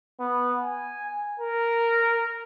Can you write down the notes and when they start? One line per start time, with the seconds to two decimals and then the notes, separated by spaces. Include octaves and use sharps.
0.20 B3
0.62 G#5
1.40 A#4